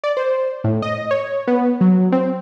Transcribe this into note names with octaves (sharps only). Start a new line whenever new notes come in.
D5
C5
A2
D#5
C#5
B3
F#3
C4